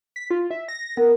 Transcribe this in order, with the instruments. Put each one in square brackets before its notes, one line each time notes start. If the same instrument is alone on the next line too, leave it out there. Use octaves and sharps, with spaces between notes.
[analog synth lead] B6
F4
E5
A#6
[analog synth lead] B3 [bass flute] A#4